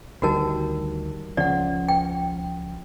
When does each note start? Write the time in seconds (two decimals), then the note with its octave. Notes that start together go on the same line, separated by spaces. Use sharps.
0.22 D2 D#3 G3 F#4 A#4 A5
1.37 C#2 C#3 F3 D5 F#5
1.88 G5